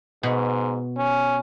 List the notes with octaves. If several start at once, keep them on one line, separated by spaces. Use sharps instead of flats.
G#2 B2
C#4